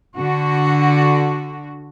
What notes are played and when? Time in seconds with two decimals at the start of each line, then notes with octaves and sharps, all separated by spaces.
0.16 D3 F#4